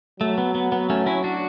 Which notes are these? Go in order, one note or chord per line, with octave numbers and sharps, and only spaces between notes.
F#3 A3
B3
B3
B3
A3 C#4
C#4 E4
D4 F#4